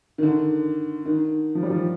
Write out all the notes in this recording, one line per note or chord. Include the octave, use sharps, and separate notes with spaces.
D#3
D3
D#3
F3
G3
F3